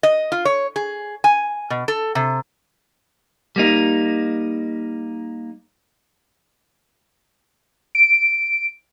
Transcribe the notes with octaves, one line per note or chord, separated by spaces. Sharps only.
D#5
F4
C#5
G#4
G#5
B2
A4
C3
G3 A#3 D#4
D7